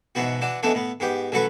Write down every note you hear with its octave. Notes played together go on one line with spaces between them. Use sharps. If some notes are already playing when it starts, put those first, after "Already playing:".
G#2 B2 E3 B3 F#4
E3 D4 F#4
E3 G#3 A3 B3 D4
A2 B3
G#2 B3 G4
A1 F#3 F#4 A4 B4 C#6